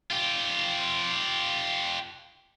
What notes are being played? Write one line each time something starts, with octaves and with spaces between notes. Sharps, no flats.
F4 G4